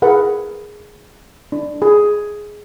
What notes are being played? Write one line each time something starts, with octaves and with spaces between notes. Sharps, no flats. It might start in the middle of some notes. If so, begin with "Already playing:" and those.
G#4 A#4 B4 F#5
D4
G#4